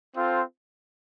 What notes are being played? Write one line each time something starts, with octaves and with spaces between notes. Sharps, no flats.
C4 F4 A4 C5